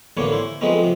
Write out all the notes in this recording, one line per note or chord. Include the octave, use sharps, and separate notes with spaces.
A1 D3 E3 A#3 B3 C#5
E4 C5
F3 G#3 A3 B3 C4 D#4
C3 F3